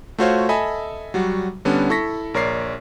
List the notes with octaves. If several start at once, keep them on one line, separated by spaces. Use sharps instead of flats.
A3 F4 F#4 C5 C#5 F5
A4 D#5 E5 G#5 B5
F#3 G3 F#4
D3 G3 B3 C#4 D4
E4 A4 C#6 A#6 B6
A#1 A#4 C#5 D5 C7